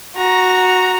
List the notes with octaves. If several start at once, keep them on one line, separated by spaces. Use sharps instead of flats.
F#4 A#5